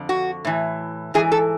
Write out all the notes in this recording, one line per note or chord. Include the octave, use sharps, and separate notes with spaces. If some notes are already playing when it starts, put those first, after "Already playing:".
Already playing: F2 D3
F#4
A2 E3
G#2 E3 G#4
A4